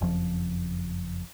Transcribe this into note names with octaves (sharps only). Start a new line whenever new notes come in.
F#1 F2 F3